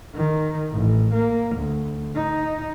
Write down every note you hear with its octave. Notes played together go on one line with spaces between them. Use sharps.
D#3
A1
A#3
D2
D#4